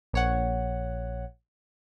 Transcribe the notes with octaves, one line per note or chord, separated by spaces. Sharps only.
A#1 C#5 F#5